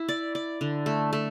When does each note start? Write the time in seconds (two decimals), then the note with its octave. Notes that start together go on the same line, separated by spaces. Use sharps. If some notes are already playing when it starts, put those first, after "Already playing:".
Already playing: E4
0.09 D5
0.35 D5
0.61 D3
0.86 A3
1.13 A3